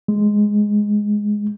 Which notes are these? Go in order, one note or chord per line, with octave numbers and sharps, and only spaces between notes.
G#3